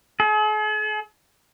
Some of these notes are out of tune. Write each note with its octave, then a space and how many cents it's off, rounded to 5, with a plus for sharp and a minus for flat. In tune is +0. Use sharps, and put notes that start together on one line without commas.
G#4 +45